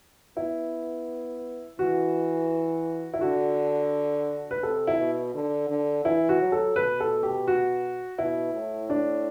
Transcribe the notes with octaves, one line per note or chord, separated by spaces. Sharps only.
B3 E4
E3 F#4
E4
D3 F#4
B4
C3 A4
E4
B2
D3
D3
E3 E4
F#4
F#3
A4
B2 B4
A4
G4
F#4
B2 E4
A2
D4